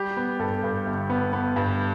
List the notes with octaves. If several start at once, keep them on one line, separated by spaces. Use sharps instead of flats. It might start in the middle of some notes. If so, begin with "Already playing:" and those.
Already playing: G3 G4
B3
G2 A4
G2
G1
B3
B3
G2